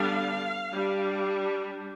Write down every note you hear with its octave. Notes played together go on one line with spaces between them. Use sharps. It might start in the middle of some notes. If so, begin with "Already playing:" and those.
Already playing: D3 G3 B3 D4 F5
G3 D4